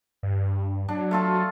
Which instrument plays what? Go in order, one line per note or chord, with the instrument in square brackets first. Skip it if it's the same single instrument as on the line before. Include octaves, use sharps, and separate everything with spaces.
[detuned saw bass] G2
[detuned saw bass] F#3 [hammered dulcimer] D4
[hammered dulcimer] A3 F4 A4